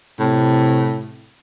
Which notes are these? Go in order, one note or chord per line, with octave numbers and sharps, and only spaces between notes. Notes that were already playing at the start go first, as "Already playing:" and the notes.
A2 C3